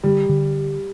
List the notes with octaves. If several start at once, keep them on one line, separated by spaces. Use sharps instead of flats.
D3 G3
D3